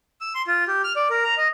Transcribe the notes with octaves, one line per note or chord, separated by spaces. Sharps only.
E6
C6
F4
G4
F6
D5
A#4
A#5
D#5